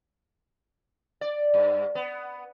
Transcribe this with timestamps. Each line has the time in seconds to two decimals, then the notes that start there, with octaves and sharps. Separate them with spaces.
1.21 D5
1.54 G2
1.95 B3